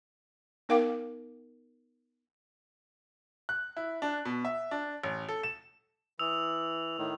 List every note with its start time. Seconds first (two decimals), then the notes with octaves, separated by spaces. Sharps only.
0.69 B3 D#4 A#4 F5 G5 D6
3.49 F#6
3.77 E4
4.02 D4
4.25 B2
4.45 E5
4.71 D4
5.04 A1
5.29 A4
5.43 E7
6.19 E3 D#6 E6 F7
6.98 A2 D#3